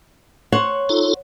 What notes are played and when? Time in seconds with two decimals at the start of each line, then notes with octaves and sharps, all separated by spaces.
0.52 C5 C#5 F#5
0.89 D#4 F4 A4